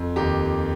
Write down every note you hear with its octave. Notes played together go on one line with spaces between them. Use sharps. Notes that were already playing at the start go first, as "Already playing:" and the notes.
Already playing: F2
D#2 G4